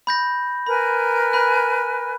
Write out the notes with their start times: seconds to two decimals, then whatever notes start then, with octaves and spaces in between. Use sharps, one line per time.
0.07 B5 G6 A#6
0.66 A#4 B4 G#5 B5
1.33 B5 F#6